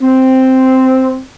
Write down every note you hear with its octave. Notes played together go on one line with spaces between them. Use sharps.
C4